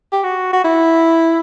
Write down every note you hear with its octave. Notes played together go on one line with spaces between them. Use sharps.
G4
F#4
F#4
E4